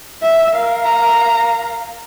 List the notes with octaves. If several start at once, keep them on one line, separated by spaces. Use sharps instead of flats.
E5
A#4 F5
A#5